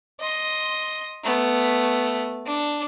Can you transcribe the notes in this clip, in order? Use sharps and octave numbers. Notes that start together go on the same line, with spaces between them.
D#5 C6
A3 B3
D4